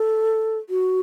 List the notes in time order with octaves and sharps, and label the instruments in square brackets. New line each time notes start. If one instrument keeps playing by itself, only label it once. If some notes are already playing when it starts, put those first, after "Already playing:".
Already playing: [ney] A4
F#4